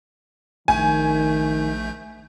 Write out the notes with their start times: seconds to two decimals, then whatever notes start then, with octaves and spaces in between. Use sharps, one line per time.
0.68 A#1 D#3 A3 G#5 G6